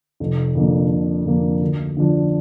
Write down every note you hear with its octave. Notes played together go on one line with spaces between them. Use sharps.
F1
F2 D3 A#3 D4
F1
F2 D3 A#3 D4
D2
D3 F3 D4